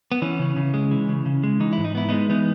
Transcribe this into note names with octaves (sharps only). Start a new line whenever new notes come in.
B3
E3 C#4
C#3
C#3
G#3
E3
C#3
C#3
G#3
E3 D#4
G#2 E4
D#4
B3 E4
G#3 B3 D#4
E3 B3 D#4